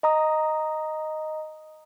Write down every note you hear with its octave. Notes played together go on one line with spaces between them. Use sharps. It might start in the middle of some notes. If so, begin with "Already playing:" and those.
D#5 A#5 D#6